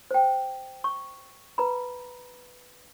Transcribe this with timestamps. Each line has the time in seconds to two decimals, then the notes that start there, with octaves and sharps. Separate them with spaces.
0.11 C5 G5
0.84 C#6
1.58 B4 A#5 B5